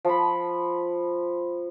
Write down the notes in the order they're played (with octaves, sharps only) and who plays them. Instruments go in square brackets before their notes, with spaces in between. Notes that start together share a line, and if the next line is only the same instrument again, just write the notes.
[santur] F3 B5